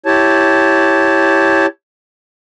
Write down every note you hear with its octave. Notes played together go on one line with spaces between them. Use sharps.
E4 G4 C#5 A5